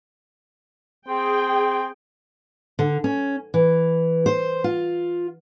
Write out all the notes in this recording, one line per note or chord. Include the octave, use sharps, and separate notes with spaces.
C4 G#4 G5
D3
C#4
E3
C5
F4